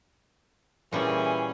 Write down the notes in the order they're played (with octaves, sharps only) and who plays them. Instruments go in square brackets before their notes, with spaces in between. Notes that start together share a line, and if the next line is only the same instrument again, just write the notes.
[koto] A#2 G3 [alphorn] E3 [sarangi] C#4 [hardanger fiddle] G#4